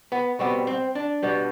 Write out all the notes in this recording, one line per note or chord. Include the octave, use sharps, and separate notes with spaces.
B3
B2 G3 B3 C4
C4
D4
B2 G3 B3